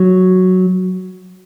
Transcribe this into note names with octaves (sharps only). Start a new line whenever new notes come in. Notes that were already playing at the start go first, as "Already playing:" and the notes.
Already playing: F#3